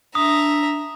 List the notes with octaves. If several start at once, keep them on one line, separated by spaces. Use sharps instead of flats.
D4 E5 A#5 D#6